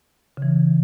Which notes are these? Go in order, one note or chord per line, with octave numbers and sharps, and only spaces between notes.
C#3 E3